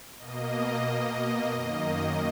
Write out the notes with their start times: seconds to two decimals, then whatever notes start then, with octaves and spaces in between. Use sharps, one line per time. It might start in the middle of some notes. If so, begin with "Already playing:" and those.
0.18 B2 A#3 D#5
1.50 F#2 D#3 A#3 D#5